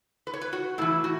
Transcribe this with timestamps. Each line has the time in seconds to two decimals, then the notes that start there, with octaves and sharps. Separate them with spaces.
0.27 B4
0.33 C#5
0.41 B4
0.53 F#4
0.78 A2 E3 E4
1.04 F#4